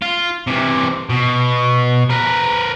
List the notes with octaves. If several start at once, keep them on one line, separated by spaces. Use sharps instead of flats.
F4
C3 E3
B2
A#4 B4